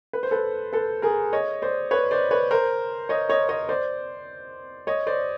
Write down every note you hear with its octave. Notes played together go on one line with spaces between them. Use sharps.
B4
C5
A4 B4
A4 B4
G#4 A#4
C#5 D#5
C5 D5
B4 C#5
C5 D5
B4 C#5
A#4 C5
C#5 D#5
C#5 D#5
C#5 D#5
C5 D5
C#5 D#5
C5 D5